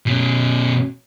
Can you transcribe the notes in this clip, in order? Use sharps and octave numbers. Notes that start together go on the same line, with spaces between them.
B2 C#4